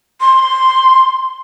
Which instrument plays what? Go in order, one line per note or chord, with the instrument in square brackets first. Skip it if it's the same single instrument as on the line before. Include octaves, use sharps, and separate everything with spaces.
[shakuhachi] C6